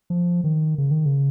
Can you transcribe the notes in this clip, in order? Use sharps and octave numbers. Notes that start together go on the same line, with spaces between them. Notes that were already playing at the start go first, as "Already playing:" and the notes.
F3
D#3
C#3
D#3
C#3